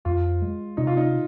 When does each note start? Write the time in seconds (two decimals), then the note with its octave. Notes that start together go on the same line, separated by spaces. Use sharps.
0.05 F2 F4
0.42 G#3
0.77 C3 D#4
0.87 F4
0.97 D#4